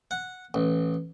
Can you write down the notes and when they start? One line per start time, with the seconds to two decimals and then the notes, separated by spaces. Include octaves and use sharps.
0.11 F#5
0.54 A1